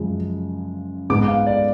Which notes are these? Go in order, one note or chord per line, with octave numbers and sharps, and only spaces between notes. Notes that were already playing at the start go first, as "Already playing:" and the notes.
Already playing: F#2 C#3 F3 G#3
G#2 G#3 B3 D6
F5
D5